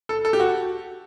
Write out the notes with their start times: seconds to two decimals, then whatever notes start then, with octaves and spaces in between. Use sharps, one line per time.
0.09 A4
0.25 A4
0.33 G4
0.40 F#4